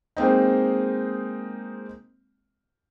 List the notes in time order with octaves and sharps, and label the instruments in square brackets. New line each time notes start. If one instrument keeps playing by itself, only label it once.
[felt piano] G#3 A#3 C4 D#4